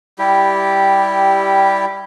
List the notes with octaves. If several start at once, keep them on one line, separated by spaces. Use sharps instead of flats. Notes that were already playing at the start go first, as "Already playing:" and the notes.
G3 E4 G4